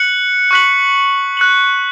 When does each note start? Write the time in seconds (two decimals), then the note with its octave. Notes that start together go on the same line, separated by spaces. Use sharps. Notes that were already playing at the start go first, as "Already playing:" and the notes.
Already playing: F#6 C#7 F#7
0.51 C#6 F#6 B6 F#7
1.37 F#6 C#7 F#7